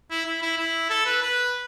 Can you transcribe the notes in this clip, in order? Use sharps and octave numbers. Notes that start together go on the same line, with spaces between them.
E4
E4
E4
E4
A4
B4
B4